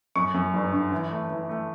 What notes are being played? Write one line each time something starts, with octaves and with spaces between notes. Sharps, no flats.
F#2 C#6
F#2
G1
D3
E3
A3
E3
A3